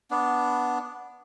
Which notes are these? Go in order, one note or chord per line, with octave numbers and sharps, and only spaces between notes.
B3 D4